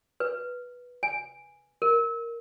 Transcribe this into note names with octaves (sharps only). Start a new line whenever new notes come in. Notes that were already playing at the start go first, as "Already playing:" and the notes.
B4
G#5
A#4